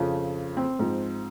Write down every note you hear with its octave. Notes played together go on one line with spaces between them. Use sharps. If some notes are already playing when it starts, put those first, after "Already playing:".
Already playing: F2 C#3 F3
C4
G#2 F3